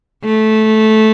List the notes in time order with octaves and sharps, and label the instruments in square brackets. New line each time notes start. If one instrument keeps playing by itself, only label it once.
[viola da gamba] A3